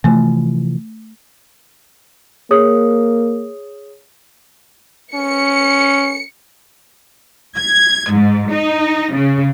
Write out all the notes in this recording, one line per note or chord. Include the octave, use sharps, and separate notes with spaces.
C3 E3 F3 A3
A#3 G#4 C#5 D#6
C#4 C#7
G#6
G#2
D#4
C#3